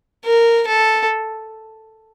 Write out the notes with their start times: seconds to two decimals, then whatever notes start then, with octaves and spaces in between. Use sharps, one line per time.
0.25 A#4
0.68 A4